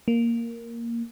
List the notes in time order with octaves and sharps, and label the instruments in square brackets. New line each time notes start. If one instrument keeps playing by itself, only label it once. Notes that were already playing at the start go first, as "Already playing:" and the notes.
[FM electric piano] A#3